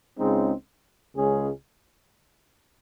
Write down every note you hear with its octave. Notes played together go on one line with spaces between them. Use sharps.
C#2 C#3 G#3 C4 D#4
C#2 C#3 G#3 C#4 G#4